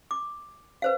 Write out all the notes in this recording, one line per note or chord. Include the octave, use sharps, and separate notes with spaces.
D6
B4 C5 F5